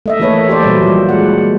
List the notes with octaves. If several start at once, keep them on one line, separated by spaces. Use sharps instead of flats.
A3 D#5 E5
E3 A#3 E4 A4 B4 C#5
G4 C5 D5
A#2 F#3 G3
F3 G3
G#3 F#5